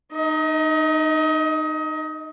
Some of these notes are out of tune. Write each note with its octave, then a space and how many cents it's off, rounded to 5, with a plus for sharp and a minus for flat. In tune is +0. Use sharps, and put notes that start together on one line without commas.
D#4 -20 D#5 +30